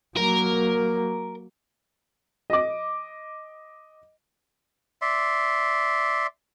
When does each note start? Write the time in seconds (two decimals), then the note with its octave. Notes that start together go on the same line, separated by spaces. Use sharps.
0.17 F#3 A#3 A#4
2.50 D#5 D6
5.02 D5 E5 C6